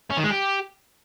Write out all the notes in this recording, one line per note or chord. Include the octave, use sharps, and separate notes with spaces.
C#4
D#3
G#3
G4